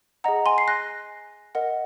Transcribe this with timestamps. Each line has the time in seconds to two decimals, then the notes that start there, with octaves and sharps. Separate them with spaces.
0.24 G#4 D#5 F#5 A#5
0.46 G#5 C6
0.58 C7
0.68 F#6 A#6
1.55 A#4 D#5 F#5